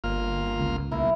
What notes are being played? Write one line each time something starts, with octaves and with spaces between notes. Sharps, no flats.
G1 A#3 F4 F6
C#2
B1 A#3 E4